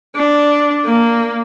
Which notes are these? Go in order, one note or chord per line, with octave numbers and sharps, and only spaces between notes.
D4
A#3